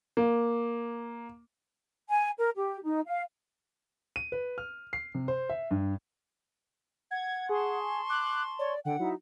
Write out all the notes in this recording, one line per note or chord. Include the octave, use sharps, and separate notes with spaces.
A#3
G#5
A#4
G4
D#4
F5
D#7
B4
F6
C7
C3
C5
E5
G2
F#5 G#6
G#4 A5 C6 C#6
D6 F#6
C#5 D5
D3 F#5 G5
F#3 D#4 E4